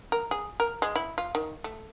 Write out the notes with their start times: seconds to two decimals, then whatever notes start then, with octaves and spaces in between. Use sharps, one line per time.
0.12 A#4
0.31 G#4
0.60 A#4
0.82 G#3
0.96 E4
1.18 F4
1.35 D#3
1.64 A3